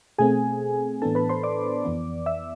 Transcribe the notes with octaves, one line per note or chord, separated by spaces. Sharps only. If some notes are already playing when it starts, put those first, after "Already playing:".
B2 A3 C4 G#4 G#5
A2 E3 B3 D4 A4 A5
B4 B5
C5 C6
D5 D6
F2 E3 B3
E5 E6